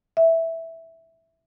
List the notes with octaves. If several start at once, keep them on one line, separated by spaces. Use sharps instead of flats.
E5